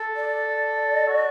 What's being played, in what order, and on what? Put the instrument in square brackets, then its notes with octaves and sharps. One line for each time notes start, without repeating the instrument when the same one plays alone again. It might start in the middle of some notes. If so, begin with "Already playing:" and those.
Already playing: [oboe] A4
[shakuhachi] D5
[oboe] F#4